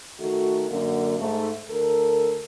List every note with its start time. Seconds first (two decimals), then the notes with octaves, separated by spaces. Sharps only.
0.20 D#3 A3 F#4 A4
0.70 F#2 D3 A#3
1.19 G#2 A3
1.70 D2 A4 A#4